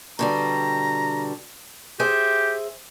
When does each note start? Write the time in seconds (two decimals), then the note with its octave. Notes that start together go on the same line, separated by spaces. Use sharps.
0.19 B2 D3 G3 A#5
2.00 G4 G#4 C5 E5